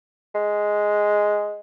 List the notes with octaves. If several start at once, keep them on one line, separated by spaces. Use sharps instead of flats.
G#3